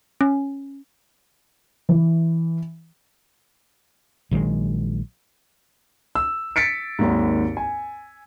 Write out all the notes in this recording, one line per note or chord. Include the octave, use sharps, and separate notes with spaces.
C#4
E3
A#1 D#3 F#3 G#3
E6
A6 B6 C#7 D7
G#1 D#2 G#2
G#5